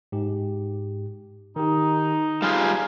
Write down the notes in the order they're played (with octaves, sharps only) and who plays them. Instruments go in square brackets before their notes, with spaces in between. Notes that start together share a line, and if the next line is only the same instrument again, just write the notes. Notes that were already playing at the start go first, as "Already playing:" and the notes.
[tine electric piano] G#2 G4
[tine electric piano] D#3 G4 [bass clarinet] D#4
[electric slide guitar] G3 F4 G#4 [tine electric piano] F5 G#5 A#5